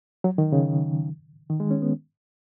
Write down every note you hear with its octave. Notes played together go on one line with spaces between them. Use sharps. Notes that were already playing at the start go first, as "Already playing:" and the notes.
F#3
D#3
C#3
D#3
G#3
C#4
B3